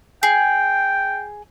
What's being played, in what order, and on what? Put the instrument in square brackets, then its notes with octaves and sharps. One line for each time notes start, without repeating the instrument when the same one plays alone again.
[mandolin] G#4 [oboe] G5